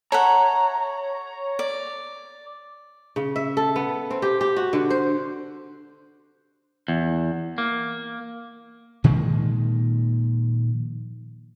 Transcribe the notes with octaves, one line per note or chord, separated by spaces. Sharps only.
A4 C#5 E5 F#5 A#5
D5
C#3
E5
A4
B3
C4
G4
G4
F#4
D3
C5
E2
A#3
A#2 D#3 F3 G#3